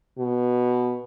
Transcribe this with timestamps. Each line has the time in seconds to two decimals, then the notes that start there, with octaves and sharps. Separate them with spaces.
0.18 B2